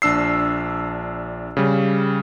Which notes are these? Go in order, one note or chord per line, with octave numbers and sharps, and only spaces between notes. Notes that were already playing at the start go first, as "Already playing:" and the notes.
A#1 D4 E6 C7
C#3 G3